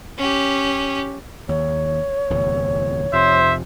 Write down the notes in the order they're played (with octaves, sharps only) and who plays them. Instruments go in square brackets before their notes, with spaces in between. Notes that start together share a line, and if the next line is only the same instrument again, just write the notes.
[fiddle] C#4 G4
[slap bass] D#2 [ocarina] C#5
[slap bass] D1 E2 C3
[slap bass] F2 C3 F3 [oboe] C5 [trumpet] E5